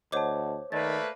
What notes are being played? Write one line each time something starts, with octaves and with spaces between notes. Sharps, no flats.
D2 C5 C#5 D#5 F#5 A5 D6
D#3 A3 A#3 B4 D5 A6